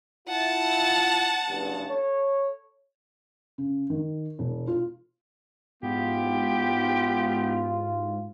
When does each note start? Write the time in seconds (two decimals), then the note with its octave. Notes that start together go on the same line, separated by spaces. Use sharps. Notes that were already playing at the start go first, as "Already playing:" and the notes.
0.28 E4 F4 F#5 A5
1.49 F#1 E2 G2
1.89 A4 C#5
3.58 C#3
3.90 D#3
4.39 E1
4.68 F4
5.83 A1 G#2 B3 F4 G4